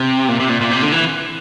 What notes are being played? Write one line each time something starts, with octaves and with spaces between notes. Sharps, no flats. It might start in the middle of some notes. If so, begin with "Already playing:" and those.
Already playing: C3
A#2
C3
A#2
A#2
C3
D3
E3